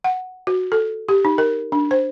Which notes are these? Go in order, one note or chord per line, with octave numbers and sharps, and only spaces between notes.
F#5
F#4
A4
G4
D#4
A#4
D4
C5